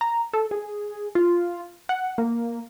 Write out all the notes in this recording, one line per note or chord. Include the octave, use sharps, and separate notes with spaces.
A#5
A4
G#4
F4
F#5
A#3